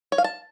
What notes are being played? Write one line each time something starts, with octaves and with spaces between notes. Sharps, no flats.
C#5
F5
A5